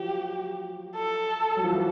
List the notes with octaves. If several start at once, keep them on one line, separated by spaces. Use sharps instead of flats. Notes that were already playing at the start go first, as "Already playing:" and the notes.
Already playing: F3 F#3 G4
A4
F#3
F3
E3